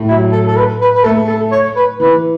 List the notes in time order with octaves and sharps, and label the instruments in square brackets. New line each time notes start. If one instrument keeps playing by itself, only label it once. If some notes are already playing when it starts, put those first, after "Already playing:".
Already playing: [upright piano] A2 A3
[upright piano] F#3 [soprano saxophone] E4
[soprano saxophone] A4
A4
B4
B4
B4
[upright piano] A3 [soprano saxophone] A4
[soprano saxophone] A4
C#5
B4
[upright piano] E3 [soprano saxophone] B4